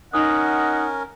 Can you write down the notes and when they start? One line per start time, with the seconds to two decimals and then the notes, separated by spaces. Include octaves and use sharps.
0.13 C#4 D#4 A#4 D#5 F#5 D#6